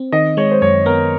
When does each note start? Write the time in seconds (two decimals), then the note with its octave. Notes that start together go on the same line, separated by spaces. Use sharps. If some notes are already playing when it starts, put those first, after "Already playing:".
Already playing: C4
0.12 D#3 D#5
0.37 G#3 C#5
0.51 C5
0.61 F#2 C#5
0.86 B3 A#4